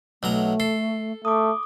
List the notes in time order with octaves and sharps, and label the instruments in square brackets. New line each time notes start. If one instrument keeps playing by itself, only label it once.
[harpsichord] B1 F#3 A#5 [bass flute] A3
[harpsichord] A4 [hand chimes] C7
[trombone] A3 [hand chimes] D6 D#6